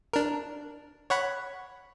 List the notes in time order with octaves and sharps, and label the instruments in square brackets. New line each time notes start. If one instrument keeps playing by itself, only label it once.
[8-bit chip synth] D4 A#4
C#5 F#5 B5